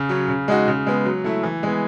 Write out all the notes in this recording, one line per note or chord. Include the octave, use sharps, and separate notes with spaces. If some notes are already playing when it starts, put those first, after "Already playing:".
Already playing: C#3
F#3 C#4
C#3
G#3 D#4 F#4
C#3
G#3 B3
F#3
A3 E4
E3
G#3 B3